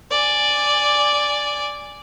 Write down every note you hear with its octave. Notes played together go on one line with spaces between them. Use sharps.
D5 G#5